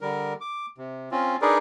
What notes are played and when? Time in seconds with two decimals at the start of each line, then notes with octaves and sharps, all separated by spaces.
0.01 D3 G3 A#4
0.41 D6
0.78 C3
1.12 C4 C#4 F4
1.42 D4 D#4 G#4 A#4 B4 D5